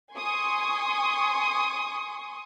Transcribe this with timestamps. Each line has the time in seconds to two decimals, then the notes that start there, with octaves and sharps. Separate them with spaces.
0.14 G#5 C6 C#6 D#6